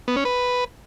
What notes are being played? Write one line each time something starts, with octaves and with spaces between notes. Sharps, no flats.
B3
C#4
B4